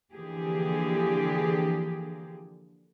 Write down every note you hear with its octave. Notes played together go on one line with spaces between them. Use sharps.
D3 E3 F3 A#3 G4 G#4